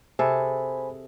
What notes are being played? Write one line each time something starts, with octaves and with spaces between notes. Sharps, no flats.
C3 G#4 A4 C5 G#5 B5